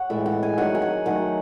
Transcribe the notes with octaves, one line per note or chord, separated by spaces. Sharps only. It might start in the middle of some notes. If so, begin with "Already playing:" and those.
Already playing: C#5 F#5
A2 E3 G#3 E5
F#5
G#5
D#3 F#3 A3 F#5
G#5
F#5
D#3 F#3 A3 F#5